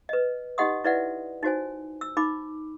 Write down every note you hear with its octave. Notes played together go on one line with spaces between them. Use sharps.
B4 D#5
D#4 G4 D#5 F#5 C6 D#6
E4 B4 D5 E5 F#5
D#4 F#4 C5 G#5
E6
D#4 B5 D6